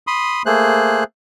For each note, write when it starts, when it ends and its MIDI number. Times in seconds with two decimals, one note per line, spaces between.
0.07 0.43 83
0.07 0.43 84
0.07 0.43 87
0.46 1.04 57
0.46 1.04 58
0.46 1.04 68
0.46 1.04 72
0.46 1.04 90